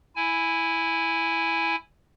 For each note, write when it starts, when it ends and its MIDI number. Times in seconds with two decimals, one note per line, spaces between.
0.16 1.76 64
0.16 1.76 80